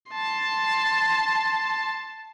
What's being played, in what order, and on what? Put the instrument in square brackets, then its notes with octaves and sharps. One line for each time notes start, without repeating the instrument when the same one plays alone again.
[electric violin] A5 C6